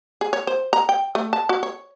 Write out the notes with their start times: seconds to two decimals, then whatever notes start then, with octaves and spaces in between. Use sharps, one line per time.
0.21 G#4
0.33 C#5
0.47 C5
0.73 A#5
0.89 G5
1.15 A3
1.33 A5
1.49 F#4
1.63 C#5